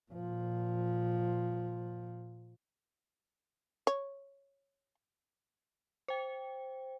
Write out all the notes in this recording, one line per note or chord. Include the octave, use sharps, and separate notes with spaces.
A#2 F3
C#5
C5 G5